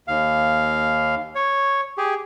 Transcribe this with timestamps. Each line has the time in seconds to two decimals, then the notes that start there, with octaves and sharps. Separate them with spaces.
0.08 D#2 F5
1.35 C#5
1.98 G4 G#4